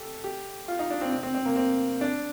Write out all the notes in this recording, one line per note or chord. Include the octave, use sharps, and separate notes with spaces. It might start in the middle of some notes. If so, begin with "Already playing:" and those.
Already playing: G4 A4
G4
F4
D#4
D4
C4
C4
C4
C4
A#3
C4
D4